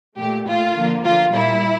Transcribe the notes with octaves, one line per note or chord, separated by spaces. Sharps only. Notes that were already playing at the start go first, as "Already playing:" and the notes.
A#2 A3 G4
A#2 A3 F4
D3 F3 A#3
D3 F3 A#3 F4
A#2 G3 A#3 E4